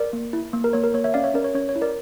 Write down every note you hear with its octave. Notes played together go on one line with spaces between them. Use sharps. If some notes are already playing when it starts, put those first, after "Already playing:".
Already playing: A#4 D5
A#3
E4
A#3
A#4
A#3 C#5
A#4
A#3 C#5
C#5 E5
C#4 D5 F5
C#5 E5
C#4 A#4 D5
C#5
C#4 C#5
C#5
E4
A#4 D5